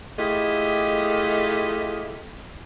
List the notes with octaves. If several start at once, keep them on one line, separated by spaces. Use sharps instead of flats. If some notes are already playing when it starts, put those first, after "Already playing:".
A3 E4 F4 G4 G#4 D#5